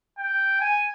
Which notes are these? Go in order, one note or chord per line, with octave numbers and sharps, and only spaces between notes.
G5
G#5